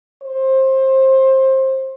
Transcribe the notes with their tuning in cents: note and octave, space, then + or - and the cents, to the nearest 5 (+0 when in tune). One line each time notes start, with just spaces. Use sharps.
C5 +25